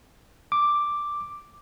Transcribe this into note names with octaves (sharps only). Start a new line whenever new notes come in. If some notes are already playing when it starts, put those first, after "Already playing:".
D6